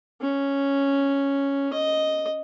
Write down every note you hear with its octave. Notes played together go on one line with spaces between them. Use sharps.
C#4
D#5